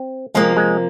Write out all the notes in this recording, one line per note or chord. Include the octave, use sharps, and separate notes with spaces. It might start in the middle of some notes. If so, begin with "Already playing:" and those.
Already playing: C4
C3 F3 G#3 A#3
G#3